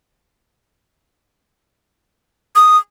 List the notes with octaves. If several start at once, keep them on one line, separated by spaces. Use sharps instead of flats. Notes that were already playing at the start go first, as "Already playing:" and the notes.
D#6